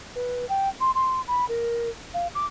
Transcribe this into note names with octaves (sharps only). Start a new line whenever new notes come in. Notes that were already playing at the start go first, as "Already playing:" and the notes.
B4
G5
C6
C6
B5
A#4
F5
D6